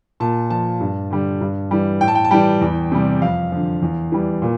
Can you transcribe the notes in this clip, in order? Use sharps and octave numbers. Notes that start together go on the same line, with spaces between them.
A#2 A5
F3 A5
G2
D3 G3
G2
E3 G3
A2 G5
A5
G5
A5
E3 G3 G5
E2
C3 G3
F2 F5
D3 F3
E2
E3 G3
A#2